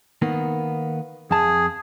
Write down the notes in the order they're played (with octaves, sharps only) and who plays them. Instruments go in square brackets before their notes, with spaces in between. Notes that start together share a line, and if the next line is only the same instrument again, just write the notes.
[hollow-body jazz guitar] D#3 A#3 B3
[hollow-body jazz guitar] F2 A5 [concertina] G#4